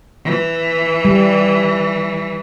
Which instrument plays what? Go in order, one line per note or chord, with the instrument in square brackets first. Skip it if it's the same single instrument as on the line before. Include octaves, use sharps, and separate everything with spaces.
[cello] E3
[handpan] G3